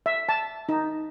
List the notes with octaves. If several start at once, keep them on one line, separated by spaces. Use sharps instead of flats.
E5
A5
D#4